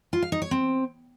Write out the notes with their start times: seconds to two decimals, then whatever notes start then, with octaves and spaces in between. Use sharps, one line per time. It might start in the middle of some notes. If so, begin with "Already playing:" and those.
0.13 F4
0.22 F5
0.32 D#4
0.42 C#5
0.51 C4